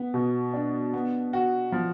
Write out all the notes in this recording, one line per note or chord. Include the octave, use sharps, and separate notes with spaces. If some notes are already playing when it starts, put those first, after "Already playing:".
Already playing: B3
B2
D4
B3
F#4
F3